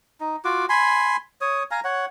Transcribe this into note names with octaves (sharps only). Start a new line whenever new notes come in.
D#4
F4 F#4 D6
G#5 B5 C6
C#5 D#6
F5 G#5 A#5
C#5 F#5